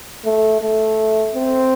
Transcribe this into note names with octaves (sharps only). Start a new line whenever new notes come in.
A3
A3
C4